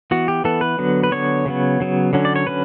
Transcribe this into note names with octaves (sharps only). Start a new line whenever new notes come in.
E3 B3 F#4
G4
E3 B3 A4
B4
D3 F#3 B3
B4
D3 F#3 B3 C#5
C#3 F#3 B3
C#3 F#3 B3
D3 F#3 C#4
D5
C#5
D3 F#3 C#4 B4